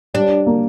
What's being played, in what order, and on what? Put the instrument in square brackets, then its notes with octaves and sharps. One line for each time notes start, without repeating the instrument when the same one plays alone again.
[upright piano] G3 [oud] D4
[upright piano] A#3